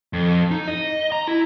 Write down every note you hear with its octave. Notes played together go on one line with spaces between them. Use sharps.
F2
D#4
D#5
A#5
E4